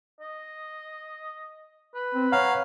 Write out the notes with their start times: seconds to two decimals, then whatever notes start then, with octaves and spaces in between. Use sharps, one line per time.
0.20 D#5
1.95 B4
2.15 C4
2.32 C#5 F5 F#5 A#5